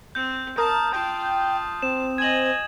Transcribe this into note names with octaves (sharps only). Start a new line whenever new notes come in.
C4 G6
A#4 A5 D#6
F4 G5 A5
C4 E7
D#5 G#5 G#6 F#7